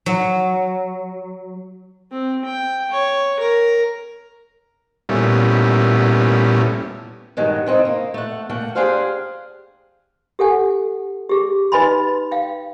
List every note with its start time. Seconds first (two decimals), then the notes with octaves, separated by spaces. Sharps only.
0.06 F#3
2.12 C4
2.46 G5
2.91 C#5
3.39 A#4
5.09 A#2 G3 A3 B3 C#4 E4
7.37 G2 D#3 F#3 G#3
7.66 C#3 C4 D#4 E4
7.85 A#3
8.14 A3 F#5
8.49 A3 A#3 F#5 G5
8.75 D4 G4 G#4 C5 F5 F#5
10.39 G4 A4 F#5 G#5
11.29 G4 G#4
11.72 D#4 B4 D#5 G#5 B5 C6
12.31 F5 G5